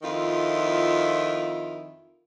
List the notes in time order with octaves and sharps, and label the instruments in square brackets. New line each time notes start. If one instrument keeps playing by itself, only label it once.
[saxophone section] F2 D#3 E4 F4